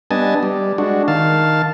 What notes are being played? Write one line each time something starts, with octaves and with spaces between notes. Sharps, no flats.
G3 B3 D4 D#5 G#5 A5
G3
G#3 D4 F#4
D#3 F5 A5